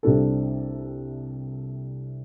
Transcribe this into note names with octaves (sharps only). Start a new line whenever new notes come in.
C2 C3 G3 D4 A4